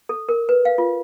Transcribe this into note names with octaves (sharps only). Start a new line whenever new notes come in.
A4
A#4
B4
F5
F4